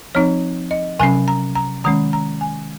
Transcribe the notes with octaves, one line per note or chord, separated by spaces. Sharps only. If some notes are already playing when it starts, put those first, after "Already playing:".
F3 C4 D#4 C#5
D#5
C3 F#3 C#4 G#5
A#5
A#5
D#3 G#3 C#4 A#5
A#5
G#5